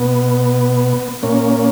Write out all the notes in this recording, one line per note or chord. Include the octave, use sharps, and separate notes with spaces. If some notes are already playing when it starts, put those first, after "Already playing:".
Already playing: B2 B3
A#2 A#3 C#4